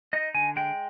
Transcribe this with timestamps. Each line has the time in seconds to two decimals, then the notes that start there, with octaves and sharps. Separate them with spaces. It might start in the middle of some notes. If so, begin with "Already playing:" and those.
0.13 D#4 D#5
0.34 D3 G#5
0.56 G#3 G5